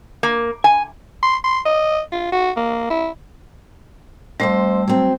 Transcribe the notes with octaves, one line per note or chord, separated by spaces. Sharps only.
A#3
G#5
C6
C6
D#5
F4
F#4
A#3
E4
F2 G3 A3 F#4 C5 E6
F#3 C4